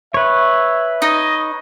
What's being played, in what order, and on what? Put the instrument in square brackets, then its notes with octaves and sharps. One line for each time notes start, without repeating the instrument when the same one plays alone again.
[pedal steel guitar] B4 C#5 [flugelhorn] E5
[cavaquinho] D#4 [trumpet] D#5